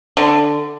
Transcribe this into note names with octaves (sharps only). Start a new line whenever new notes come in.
D3